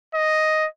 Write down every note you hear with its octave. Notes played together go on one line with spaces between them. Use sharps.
D#5